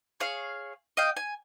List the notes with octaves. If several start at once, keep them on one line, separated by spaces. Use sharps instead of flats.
G#4 C#5 F5
D#5 F5 G5
G#5